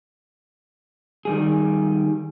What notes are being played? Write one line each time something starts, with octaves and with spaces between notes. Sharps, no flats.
D#3 G3 G#4